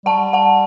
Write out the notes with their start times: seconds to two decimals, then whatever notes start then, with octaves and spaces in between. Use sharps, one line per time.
0.06 G3 F#5 A5
0.33 F#5 A5